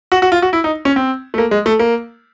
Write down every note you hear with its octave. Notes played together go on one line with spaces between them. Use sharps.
F#4
F#4
F4
F#4
E4
D#4
C#4
C4
A3
A#3
G#3
A3
A#3